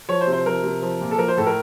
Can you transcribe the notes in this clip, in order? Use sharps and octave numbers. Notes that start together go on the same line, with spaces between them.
F3 C#5
C5
C3
C5
F3 A#4
C3
F3
A#2
A4
F3 A#4
C5
A2 A4
A#4